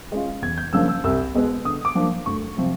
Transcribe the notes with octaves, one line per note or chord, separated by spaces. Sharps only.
G#3 C#4 F4
E2 G#6
G6
C#3 F3 A#3 D4 E6
E6
C2 E6
B2 G#3 B3
D3 D#6
D6
F3 A#3 D4
D2 C#6
C3 F3